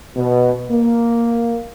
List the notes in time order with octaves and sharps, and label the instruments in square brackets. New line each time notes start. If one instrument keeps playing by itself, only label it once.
[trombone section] B2
A#3